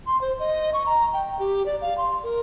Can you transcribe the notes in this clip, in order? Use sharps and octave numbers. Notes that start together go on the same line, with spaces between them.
C6
C5
D#5
C#6
A#5
G5
G4
D5
F5
C6
A#4